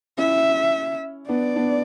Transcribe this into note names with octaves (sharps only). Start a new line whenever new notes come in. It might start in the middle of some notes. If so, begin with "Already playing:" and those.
C#4 E4 E5
B3 D4 D5
B3 D4